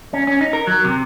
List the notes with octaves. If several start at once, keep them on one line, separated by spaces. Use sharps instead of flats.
C#4
C#4
D#4
A#4
F#3
C3